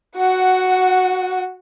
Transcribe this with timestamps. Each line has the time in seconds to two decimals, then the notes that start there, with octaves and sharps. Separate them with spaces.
0.18 F#4 F#5